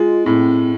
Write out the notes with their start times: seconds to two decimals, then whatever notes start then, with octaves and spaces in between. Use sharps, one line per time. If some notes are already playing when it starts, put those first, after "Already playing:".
Already playing: G#3 F4
0.26 A2 C4